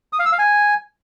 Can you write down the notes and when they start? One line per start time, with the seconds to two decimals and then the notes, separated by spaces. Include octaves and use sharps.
0.13 D#6
0.19 F5
0.26 E6
0.32 F5
0.39 G#5